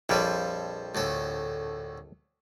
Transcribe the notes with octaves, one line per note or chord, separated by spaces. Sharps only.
A#1 F2 F3 G3 A4 C#5
D2 A2 A4